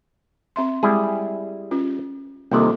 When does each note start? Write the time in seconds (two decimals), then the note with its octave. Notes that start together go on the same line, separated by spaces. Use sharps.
0.56 C4 E5 C6
0.83 G3 G#3 E4 G#4
1.71 C#4 F4
2.52 C2 C3 D#3 A#3 F4 A4